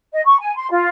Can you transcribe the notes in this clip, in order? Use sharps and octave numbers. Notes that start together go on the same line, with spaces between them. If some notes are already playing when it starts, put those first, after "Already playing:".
D#5
C#6
G#5
C6
F4